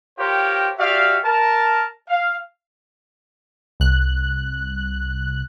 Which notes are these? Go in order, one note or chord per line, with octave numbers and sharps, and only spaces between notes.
F4 G4 A#4 C5 C#5 G5
F#4 G4 D5 E5 F5
A#4 A5
F5
C2 F#6